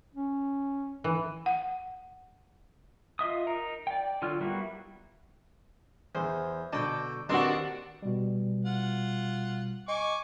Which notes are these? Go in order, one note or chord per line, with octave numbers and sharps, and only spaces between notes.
C#4
E3
F#5
F4 D#5 E5 D#6
D#4 A#4 A#5
D5 G5
D3 F#3 F4 F6
G3 A#3 B3 E4 F#4
E2 C5
B2 D3 D5 G5 A5
D#2 C4 D4 F#4 B4 D5 C6 D6
B2 G3
F4 F#5
D#5 G#5 C#6 D6